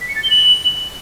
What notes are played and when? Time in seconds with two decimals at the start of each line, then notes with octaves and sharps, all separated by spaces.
0.01 B6
0.08 C#7
0.16 A6
0.23 G7
0.30 F#7